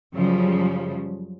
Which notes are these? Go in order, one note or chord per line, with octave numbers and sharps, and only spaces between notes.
F#2 C#3 F3 G3